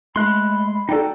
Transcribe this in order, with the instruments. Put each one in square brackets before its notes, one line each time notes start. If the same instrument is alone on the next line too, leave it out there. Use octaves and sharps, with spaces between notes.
[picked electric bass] G#3 A3 [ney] B5 [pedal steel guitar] C6 F#6
[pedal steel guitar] D#4 F#4 [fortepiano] A4 D5 G5